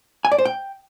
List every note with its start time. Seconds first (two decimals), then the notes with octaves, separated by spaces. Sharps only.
0.25 G#5
0.32 D5
0.38 C5
0.45 G5